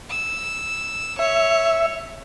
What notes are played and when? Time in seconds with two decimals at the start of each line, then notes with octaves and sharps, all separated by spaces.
0.10 E6
1.19 C#5 E5